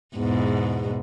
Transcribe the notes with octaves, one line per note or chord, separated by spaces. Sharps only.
E2 G#2 B2